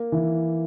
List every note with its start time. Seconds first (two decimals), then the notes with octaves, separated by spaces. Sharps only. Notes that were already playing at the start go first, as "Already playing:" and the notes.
Already playing: A#3
0.12 E3